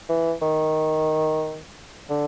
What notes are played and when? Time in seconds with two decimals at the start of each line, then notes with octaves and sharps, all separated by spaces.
0.09 E3
0.42 D#3
2.09 D3